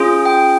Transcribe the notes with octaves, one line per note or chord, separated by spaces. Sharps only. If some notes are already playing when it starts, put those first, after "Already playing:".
Already playing: C#4 F4 G#4
G5